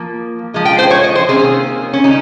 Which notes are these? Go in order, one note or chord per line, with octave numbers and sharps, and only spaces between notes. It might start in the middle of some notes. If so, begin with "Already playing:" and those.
Already playing: F3 A#3
F3 G#3
G5
C5
C#5
D#5
C5
C3 D#3 A#3 C#4 G#4
C#4
C#3 G3 C#4 D#4